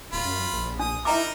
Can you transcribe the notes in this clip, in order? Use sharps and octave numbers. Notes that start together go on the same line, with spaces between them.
D1 F4 B5
F#2
F#2
A#1
D4 D#6
D#4 E4 A#4 E5 A#5 D6